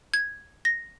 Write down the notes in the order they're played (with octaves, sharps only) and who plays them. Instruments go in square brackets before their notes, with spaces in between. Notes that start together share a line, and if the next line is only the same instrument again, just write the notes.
[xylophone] G#6
A#6